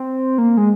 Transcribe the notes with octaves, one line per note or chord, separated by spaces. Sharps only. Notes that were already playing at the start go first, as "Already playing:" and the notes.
Already playing: C4
A#3
G#3